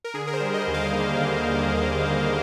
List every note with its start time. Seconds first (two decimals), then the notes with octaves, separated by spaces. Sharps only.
0.04 A#4
0.14 D3 G#4
0.27 A#4
0.33 C5
0.40 G3
0.54 D#5
0.67 D#2
0.74 F5
0.93 A#3
1.20 D3
1.47 G3
1.74 D#2
2.00 A#3
2.25 D3